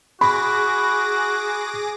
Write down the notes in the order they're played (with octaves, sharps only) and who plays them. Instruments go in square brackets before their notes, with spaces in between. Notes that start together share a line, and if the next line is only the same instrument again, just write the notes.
[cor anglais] F#4 [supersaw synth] G#4 D6 A#6 [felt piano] B5